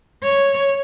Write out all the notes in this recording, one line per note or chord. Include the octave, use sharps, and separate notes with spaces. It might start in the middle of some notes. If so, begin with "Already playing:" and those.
C#5